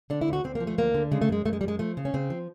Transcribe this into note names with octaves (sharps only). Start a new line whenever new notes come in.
D3 D4
E4
D2
F#4
D2 C4
A#3
F3
A3
D2 A#3
D3
C#3 G#3
A3
F#2 G#3
F#2 A3
G#3
G3
F#2 G#3
F3 A3
C#3
C#4
C#3 C4
F3